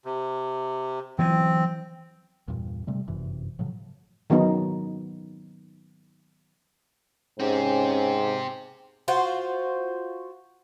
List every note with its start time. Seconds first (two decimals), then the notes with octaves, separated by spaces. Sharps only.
0.05 C3
1.19 E3 F#3 B3 C4
2.48 E2 G2 A#2
2.87 C3 G3 A3
3.08 G1 F#2 C3 E3
3.59 A2 C#3 F3 F#3
4.30 D#3 F#3 B3 D#4
7.40 G#2 C4 C#4 G4
9.08 F4 F#4 C5